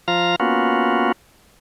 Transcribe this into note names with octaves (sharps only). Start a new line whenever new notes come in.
F3 F4 F5 A#5
A#3 B3 C#4 F4 F#4